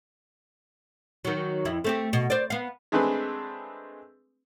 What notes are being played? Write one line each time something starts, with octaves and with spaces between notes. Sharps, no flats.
D#3 F#3
F2 E4
A3 C4 G4
B2
C5 D5
B3 F5
G#3 A3 C4 D4 B4 G#5